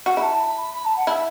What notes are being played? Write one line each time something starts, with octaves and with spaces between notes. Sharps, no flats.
F#4
E4 A5 B5
B5
B5
B5
A5
F#5
E4 E5